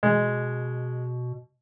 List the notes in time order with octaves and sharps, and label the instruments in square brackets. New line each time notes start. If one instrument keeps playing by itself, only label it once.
[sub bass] B2 [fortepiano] G#3